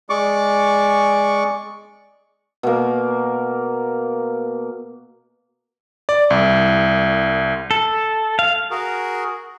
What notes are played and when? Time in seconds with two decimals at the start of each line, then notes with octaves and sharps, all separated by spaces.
0.10 G#3 D5 C#6 D6
2.63 B2 A#3
6.09 D5
6.30 C2
7.71 A4
8.39 F5
8.71 F#4 G#4 A#4